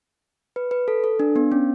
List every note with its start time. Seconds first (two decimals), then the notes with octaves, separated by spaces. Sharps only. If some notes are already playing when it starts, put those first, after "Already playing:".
0.56 B4
0.71 B4
0.88 A4
1.04 A4
1.20 D4
1.36 B3
1.52 C#4